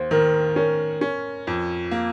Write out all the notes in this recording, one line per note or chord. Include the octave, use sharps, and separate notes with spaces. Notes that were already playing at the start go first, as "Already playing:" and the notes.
Already playing: D#2 C5
D#3 A#4
C#4 A#4
C#4
F2
A#3